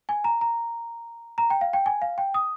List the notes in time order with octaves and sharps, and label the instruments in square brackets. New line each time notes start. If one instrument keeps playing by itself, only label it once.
[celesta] G#5
A#5
A#5
A#5
G5
F5
G5
G#5
F5
G5
D#6